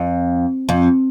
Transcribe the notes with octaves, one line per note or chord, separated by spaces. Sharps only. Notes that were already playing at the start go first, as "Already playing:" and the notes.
Already playing: F2
F2